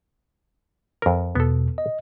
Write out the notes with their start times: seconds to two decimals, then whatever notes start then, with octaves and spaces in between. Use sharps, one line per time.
1.02 F2 A#4
1.35 E2 B2 B3 A4
1.78 D#5